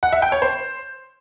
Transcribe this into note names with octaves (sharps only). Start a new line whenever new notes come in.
F#5
E5
G5
C#5
C5